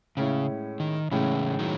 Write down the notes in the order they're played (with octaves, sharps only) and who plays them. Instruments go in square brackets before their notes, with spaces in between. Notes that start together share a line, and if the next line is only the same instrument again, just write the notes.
[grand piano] A2 G#3 C#4 E4 [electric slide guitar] C#3
[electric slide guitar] D#3
[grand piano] A2 G#3 C#4 E4 [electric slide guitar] C#3 E3
[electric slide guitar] D#3 F#3